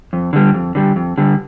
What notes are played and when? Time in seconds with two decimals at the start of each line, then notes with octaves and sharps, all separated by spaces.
0.13 F2
0.33 D3 G3
0.54 F2
0.75 D3 G3
0.96 F2
1.18 D3 G3